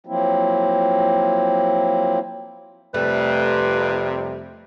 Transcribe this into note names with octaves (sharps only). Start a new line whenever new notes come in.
F3 F#3 A#3 C4 E4
F2 C3 G3 A3 B4